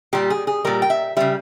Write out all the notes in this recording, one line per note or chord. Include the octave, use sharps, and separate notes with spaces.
A#2 G3 G4
G#4
G#4
A#2 G3 A#4
G5
E5
C#3 G3 E5